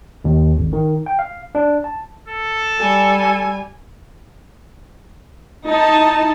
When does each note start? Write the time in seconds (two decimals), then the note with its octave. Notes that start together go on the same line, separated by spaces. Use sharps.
0.25 D#2
0.57 G#1
0.73 D#3
1.06 G5
1.19 F5
1.55 D4
1.84 A5
2.28 A4
2.79 G3 G#5
5.67 D#4 E4 A5